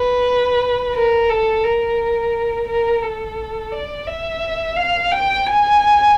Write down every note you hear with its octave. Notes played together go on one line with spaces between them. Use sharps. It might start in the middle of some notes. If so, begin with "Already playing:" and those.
Already playing: B4
A#4
A4
A#4
A#4
A4
D5
E5
F5
G5
G#5